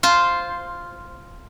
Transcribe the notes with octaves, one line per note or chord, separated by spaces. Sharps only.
F4 C5